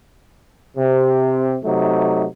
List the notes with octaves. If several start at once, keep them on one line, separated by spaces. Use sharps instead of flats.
C3
C3 F#3 A3 D#4